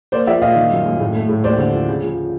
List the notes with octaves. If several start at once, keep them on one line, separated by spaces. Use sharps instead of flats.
A#3 C5 D5
F3 D5 E5
A#2 D#5 F5
D#3
F#2
F#2
A2
A3
A2
D#2 C5 D5
D3
F3
C#3
F3